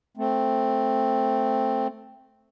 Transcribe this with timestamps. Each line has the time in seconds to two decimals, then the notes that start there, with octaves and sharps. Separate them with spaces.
0.17 A3 C4